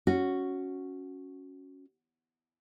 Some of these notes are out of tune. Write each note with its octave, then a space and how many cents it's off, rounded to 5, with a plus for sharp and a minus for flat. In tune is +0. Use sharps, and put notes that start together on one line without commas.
C#4 +0 F#4 -5